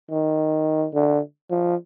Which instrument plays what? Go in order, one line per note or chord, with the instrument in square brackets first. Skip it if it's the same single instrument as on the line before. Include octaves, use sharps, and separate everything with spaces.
[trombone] D#3
D3
F3